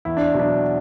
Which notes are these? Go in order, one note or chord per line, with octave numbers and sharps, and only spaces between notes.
E2 E4
D4
B2 F#3
D4